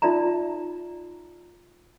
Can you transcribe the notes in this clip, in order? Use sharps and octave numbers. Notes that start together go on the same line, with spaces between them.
D#4 F4 D5 E5 A#5